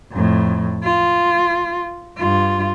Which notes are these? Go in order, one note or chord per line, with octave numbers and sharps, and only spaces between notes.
F2 A2
F4
G2 F4